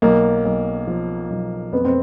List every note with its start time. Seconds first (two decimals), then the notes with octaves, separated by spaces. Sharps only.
0.02 B1 A#3
0.45 B1
0.88 F3
1.30 B1
1.73 F2 B3
1.85 C4